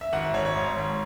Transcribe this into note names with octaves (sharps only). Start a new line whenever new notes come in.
E5
G#1 F#5
E5
G#1 C#5
C#5
G#2 C#5
G#1